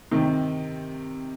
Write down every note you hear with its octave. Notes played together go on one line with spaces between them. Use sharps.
C3 D#3